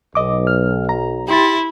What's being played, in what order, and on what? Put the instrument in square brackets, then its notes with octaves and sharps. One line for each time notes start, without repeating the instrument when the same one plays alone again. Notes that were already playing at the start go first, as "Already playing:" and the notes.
[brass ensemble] B1 [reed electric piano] D#5 D6
[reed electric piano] F6
A#5
[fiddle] E4 [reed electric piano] G4 C6 A6